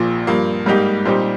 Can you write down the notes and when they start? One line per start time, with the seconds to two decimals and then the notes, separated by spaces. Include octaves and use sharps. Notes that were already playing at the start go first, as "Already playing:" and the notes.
Already playing: A#1 A#2 F3
0.27 G2 F3 A#3
0.66 G#2 G3 A#3 D#4 G4
1.06 A#2 G3 C4 D#4 G4